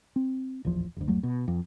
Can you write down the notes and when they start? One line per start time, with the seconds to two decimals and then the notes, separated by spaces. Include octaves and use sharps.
0.16 C4
0.65 D1 A#1 E2 F3
0.97 F#1 D2
1.08 G1 D#2 F#3 A3
1.23 B2
1.48 F2